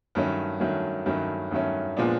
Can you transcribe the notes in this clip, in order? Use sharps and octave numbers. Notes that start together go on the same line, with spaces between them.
G2 D#3 F#3 A3 C#4
G2 D#3 F#3 A3 C#4
G2 D#3 F#3 A3 C#4
G2 D#3 F#3 A3 C#4
A#2 F3 G#3 B3 D4